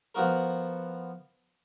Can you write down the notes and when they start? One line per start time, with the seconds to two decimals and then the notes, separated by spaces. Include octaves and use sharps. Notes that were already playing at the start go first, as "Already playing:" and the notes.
0.15 F3 B3 F#4 A#4